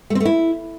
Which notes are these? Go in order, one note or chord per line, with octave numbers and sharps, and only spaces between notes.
A3
C4
A3
E4